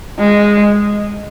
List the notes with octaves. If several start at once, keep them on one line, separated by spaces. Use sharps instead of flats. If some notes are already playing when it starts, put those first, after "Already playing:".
G#3